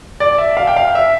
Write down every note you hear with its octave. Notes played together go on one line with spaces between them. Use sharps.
D5
E5
F5
G5
F5
E5